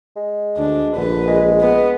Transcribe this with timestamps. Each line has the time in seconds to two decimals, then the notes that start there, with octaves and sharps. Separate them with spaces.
0.16 G#3
0.57 D2 D4
0.96 A#1 D3 B4
1.27 G#3
1.61 B3